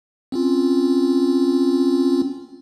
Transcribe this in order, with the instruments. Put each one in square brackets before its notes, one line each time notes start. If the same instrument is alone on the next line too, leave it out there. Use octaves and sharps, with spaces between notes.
[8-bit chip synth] C4 C#4 F4